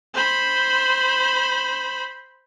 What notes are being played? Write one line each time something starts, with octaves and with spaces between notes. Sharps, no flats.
C5 B5